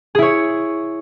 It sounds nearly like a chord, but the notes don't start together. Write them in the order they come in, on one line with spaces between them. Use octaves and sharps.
G#4 E4 C#5